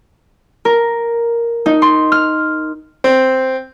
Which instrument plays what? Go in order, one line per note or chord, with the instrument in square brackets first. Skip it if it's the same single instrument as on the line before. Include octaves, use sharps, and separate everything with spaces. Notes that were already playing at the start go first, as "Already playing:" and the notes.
[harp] A#4
D#4
C6
F6
[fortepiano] C4